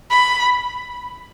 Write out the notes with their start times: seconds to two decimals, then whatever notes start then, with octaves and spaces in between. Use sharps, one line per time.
0.10 B5